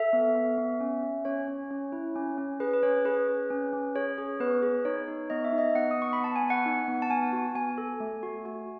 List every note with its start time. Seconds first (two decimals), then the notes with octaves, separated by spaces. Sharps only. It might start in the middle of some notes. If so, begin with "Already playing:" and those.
Already playing: A4 E5
0.13 B3
0.35 B3
0.58 B3
0.80 C#4
1.03 C#4
1.25 C#4 C#5
1.48 C#4
1.71 C#4
1.92 E4
2.15 C#4
2.38 C#4
2.60 G#4 B4
2.74 B4
2.83 C#4 C#5
3.05 G#4 B4
3.28 G#4
3.50 C#4
3.73 C#4
3.95 G#4 C#5
4.18 G#4
4.40 B3 B4
4.63 G#4
4.85 D#4 C#5
5.08 D#4
5.30 B3 D#5
5.44 E5
5.53 D#4
5.58 D#5
5.75 B3 F#5
5.91 D#6
5.97 B3 C#6
6.13 B5
6.20 B3 A5
6.36 G#5
6.43 B3
6.50 F#5
6.66 D#4
6.88 B3
7.02 A5
7.10 B3 G#5
7.33 F#4
7.55 B3 G#5
7.78 A4
8.00 A3
8.23 F#4
8.45 F#4